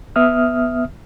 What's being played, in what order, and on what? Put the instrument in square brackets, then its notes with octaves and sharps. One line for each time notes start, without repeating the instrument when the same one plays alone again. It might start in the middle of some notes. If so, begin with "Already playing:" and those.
[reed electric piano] B3 E5 D#6 F6